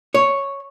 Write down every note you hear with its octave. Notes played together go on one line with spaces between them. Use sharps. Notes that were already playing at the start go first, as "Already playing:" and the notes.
C#5